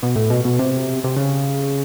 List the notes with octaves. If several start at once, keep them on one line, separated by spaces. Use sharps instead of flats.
B2
A2
B2
B2
C3
C3
C#3